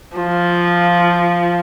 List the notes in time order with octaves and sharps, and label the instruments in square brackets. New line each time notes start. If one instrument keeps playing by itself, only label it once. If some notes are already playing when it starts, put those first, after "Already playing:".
[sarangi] F3 [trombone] F4